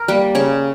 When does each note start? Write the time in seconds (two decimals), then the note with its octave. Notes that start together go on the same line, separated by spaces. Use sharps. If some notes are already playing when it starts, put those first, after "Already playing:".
Already playing: A#4
0.08 G3 A#3
0.35 C#3 C#5